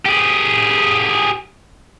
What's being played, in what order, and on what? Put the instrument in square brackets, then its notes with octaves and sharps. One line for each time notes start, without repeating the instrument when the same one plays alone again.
[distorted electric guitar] G4 G#4